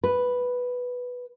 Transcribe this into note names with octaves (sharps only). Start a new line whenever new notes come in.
B4